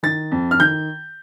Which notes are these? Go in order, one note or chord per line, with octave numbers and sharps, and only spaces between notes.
D#3 A6
F2
F6
D#3 G6